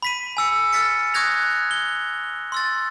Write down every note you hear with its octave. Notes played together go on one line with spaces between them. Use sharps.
B5 B6 D#7
G#5 E6 C#7
E6 F6 A6 B6 C#7
C#6 D#6 F#6 G#6 A#6 F7
G7
C6 E6 A6